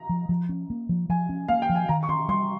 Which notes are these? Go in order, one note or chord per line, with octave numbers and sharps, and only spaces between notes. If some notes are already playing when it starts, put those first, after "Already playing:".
Already playing: A#5
F3
F3
C#4
A#3
F3
F3 G#5
C#4
A#3 F5
G5
F3
G#5
D#3 A#5
C#6
C#4 C6
G3 C6